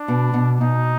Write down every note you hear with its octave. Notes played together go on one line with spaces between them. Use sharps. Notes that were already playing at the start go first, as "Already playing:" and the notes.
Already playing: D4
B2
B2
B2 D#4